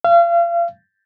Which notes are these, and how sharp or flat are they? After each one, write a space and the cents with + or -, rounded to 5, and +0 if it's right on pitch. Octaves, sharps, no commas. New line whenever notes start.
F5 -35